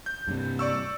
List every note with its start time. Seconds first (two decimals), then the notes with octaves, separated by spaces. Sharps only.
0.06 G6
0.28 G2 C3
0.59 D5 C#6 E6